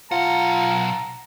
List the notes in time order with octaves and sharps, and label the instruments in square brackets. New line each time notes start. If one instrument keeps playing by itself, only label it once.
[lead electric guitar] B1 F#5 [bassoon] F4 [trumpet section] A5 A#5